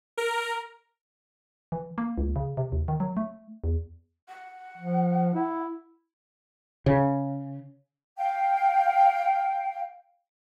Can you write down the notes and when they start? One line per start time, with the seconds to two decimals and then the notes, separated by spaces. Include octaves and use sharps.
0.17 A#4
1.72 E3
1.98 A#3
2.18 C#2
2.36 C#3
2.57 C3
2.72 D#2
2.88 D#3
3.00 F#3
3.17 A3
3.64 E2
4.28 F#5
4.78 F3
5.34 E4
6.86 C#3
8.17 F5 G5